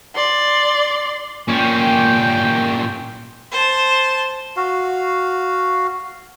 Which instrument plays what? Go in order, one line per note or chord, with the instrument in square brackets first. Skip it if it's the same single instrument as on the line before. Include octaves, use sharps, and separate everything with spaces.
[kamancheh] D5 C6
[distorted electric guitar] A#2 C#4 [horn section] G5
[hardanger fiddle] C5 A5
[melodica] F#4 F5